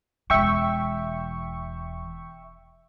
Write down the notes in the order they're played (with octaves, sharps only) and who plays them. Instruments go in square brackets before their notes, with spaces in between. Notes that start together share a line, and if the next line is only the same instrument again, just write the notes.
[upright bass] E1 E3 [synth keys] E5 G5 C#6